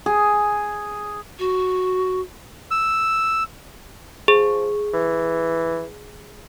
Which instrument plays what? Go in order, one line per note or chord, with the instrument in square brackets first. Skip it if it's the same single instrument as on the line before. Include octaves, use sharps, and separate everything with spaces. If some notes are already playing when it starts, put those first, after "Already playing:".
[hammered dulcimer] G#4
[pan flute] F#4
[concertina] E6
[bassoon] F3 [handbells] G#4
[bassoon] E3